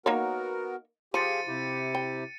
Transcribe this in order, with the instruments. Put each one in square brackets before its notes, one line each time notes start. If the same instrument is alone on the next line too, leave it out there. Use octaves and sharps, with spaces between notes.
[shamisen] A#3 D#4 C#5 [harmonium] B3 F#4 A#4
[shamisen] F3 [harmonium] F4 G4 G#4 [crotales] A6 C#7 D#7
[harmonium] C3 E4 G4
[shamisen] G5